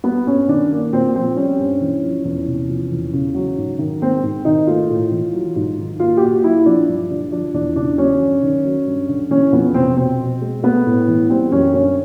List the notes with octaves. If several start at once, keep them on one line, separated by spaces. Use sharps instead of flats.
G3 B3
G2 C#4
D#3 D4
A#3
A#2 C4
F3 C4
G3 C#4
G2
E3
F3
E2
C3
F3
E2
C#3
F#3
G#2
D#3
G#3 C4
G#2
D#3 D#4
A3 F4
A2
E3
F#3
G#2
D#3
A#3 F4
G4
A#2 F#4
F#3 E4
F3 D4
G2
D3
F3 D4
E2 D4
C#3 D4
F#3 C#4
G2
D#3
F#3
G2
D3
E3 C#4
F2 B3
C3 C4
B2 C4
B2
G#3
A3 B3
A2
E3
G3 C4
F#2 C#4
D3 C#4